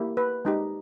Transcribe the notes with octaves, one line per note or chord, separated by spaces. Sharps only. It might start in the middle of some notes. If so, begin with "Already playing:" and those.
Already playing: A#3 E4 G4
B4
G#3 D#4 G4